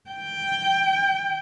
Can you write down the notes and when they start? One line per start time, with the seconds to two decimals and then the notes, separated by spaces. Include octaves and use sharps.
0.10 G5